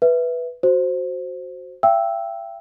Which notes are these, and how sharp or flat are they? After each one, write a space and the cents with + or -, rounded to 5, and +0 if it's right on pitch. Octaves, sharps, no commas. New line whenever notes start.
B4 +0 E5 +0
F#4 +0 C5 +0
E5 +45 G5 +0 E6 -5